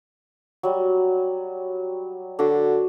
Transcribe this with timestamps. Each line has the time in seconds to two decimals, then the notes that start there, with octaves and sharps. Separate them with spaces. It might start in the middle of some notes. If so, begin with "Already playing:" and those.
0.63 F#3 G3
2.39 D3 D4 F#4